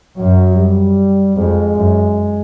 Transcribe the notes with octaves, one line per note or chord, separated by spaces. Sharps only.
F#2 F#3
G3
F2 G#3
F#2